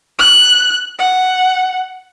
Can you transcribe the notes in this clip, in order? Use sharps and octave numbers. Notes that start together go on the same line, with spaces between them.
F#6
F#5